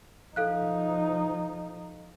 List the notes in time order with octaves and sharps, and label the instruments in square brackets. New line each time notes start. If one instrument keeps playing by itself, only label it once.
[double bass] F3 D#4 [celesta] A4 F5 F#6